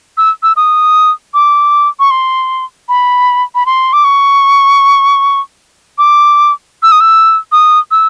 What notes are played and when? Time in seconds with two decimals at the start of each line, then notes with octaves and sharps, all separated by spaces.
0.17 E6
0.43 E6
0.57 D#6
1.34 D6
1.99 C#6
2.11 C6
2.89 B5
3.55 B5
3.66 C6
3.93 D6
4.04 C#6
5.98 D6
6.83 E6
6.92 D#6
7.00 E6
7.52 D#6
7.91 E6